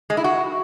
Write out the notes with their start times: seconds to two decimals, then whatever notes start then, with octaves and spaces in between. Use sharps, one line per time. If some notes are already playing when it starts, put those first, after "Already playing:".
0.10 G#3
0.17 E4
0.24 F#4